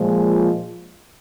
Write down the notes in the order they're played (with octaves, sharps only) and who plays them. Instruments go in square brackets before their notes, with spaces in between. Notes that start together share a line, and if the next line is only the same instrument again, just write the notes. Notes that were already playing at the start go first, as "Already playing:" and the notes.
Already playing: [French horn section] A#2 F3 G#3